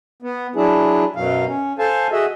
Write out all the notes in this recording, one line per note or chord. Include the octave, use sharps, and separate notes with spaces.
B3
F#3 D4 E4 G#4
F#2 B2 F#3 F5
C#4
A4 C5 F5 G#5 A5
F#4 G#4 D#5 E5